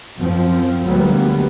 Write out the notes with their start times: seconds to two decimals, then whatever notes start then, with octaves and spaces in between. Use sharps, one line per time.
0.18 F#2 F3 C4
0.84 D2 D3 F#3 G3 A#3 B3